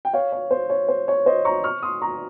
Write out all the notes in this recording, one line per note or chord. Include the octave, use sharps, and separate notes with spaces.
G5
C#5 F5
C#5
C5
C#5
C5
C#5
C5 D#5
A#5 C#6
C#6 F6
C6 D#6
A#5 C#6